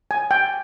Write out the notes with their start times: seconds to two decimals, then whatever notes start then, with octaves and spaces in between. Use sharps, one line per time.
0.11 G#5
0.31 G5